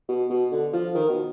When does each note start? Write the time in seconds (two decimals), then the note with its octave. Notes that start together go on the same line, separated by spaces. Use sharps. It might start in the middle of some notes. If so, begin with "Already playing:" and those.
0.09 B2
0.30 B2
0.52 D3
0.73 F3
0.95 D#3
1.09 B2